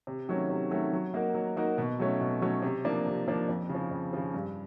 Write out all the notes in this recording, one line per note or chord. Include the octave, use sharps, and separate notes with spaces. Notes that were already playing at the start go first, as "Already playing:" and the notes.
C3
D#3 F#3 A3 C#4
C3
D#3 F#3 A3 C#4
F#3
A#3 D#4 F#4 A#4
F#3
A#3 D#4 F#4 A#4
B2
F#3 A3 C#4
B2
F#3 A3 C#4
C3
F3 A#3 D4
C3
F3 A#3 D4
F2
C#3
F3
F2
C#3 F3
G2